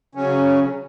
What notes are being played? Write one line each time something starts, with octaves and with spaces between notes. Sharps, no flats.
C#3 F#3 C#4